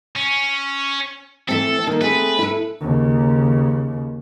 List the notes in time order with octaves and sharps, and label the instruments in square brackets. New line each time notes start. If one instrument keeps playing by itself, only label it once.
[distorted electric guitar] C#4
[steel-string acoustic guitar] E3 A3 C4 [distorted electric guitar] A4
[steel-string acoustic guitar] D#3 A#3
[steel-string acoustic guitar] A3 C4 G#4 [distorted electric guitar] B4
[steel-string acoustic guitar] E4 A4
[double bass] D#2 C#3